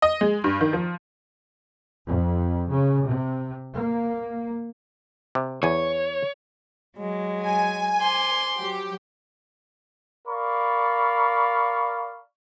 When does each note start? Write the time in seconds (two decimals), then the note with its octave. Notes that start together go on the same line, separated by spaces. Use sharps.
0.02 D#5
0.21 G#3
0.44 G2
0.61 D#3
0.73 F3
2.07 F2
2.69 C#3
3.07 C3
3.73 A#3
5.35 C3
5.63 E2 C#5 G#5
6.96 F#3 G#3
7.44 G#5
7.99 C5 C6 D6
8.59 F#3 G4
10.28 A#4 D5 F5 B5 C#6